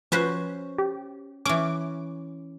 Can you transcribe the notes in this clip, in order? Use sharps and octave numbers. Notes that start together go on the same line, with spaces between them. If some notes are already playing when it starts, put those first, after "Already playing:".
F3 C#4 F#4 B4 C5
G4
E3 C#4 D6